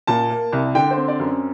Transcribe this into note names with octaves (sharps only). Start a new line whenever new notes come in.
A#2 A5
A#3
C2
D3 G5
C5
C4
D5
F#2